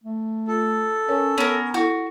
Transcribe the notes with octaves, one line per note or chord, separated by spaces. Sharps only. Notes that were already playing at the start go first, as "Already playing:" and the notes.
A3
F4 A4
C#4 A#4 C#5
B3 C#4 A#4 C#5
E4 F#4 A4